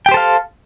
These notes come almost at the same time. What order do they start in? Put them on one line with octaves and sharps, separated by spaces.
G5 G4 C5 A4 F5